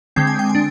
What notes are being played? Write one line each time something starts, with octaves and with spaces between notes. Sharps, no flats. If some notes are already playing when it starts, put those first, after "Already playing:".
D3 G#3 C4 G5
G#5
G5
G#5
D4